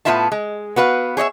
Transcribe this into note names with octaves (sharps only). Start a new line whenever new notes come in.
A2 B3 E4 F4 E5 A5
G#3
B3 F#4 B4 F5
G#4 C#5 D#5 E5